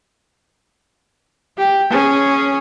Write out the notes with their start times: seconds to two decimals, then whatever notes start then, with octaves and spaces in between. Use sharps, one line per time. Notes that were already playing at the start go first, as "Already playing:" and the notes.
1.58 G4
1.90 C#4 G#4